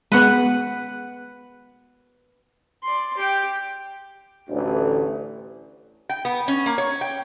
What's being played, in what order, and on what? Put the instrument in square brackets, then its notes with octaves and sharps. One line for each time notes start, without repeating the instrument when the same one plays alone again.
[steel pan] G#3 B3 [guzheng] B4 F#5
[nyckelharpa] D5 C6
G4 G5
[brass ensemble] A1 D2
[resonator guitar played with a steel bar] G5
B3
C#4
A#3
C#5
G5